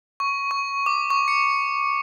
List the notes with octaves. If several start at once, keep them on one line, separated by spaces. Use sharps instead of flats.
C#6
C#6
D6
C#6
C#7